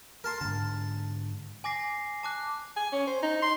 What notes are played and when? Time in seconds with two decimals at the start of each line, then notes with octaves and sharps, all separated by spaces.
0.24 A#4 A5 C6
0.41 G#2 D3 A5
1.64 G#5 D6 A#6 C7
2.23 A5 D6 F#6
2.76 G#5
2.92 C#4
3.07 C5
3.23 D#4
3.42 C6